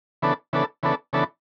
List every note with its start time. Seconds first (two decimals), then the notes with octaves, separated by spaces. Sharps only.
0.22 C#3 E3 B3 D4 A4
0.53 C#3 E3 B3 D4 A4
0.83 C#3 E3 B3 D4 A4
1.13 C#3 E3 B3 D4 A4